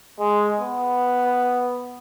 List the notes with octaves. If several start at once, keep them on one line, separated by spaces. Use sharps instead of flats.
G#3
B3